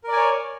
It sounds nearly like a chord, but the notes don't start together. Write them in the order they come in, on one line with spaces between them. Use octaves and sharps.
A#4 D5 G#5 C#5